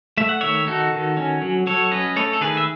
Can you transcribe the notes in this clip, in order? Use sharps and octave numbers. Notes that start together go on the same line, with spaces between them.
A3 E5
F#5
D#3 C#5 E5
D#4 F#4 A4
D#3
C#4
F#3
F#3 A4 C#5
C#4 B4 D#5
A3 A4 C#5
A4
D#3 G#4 B4
E5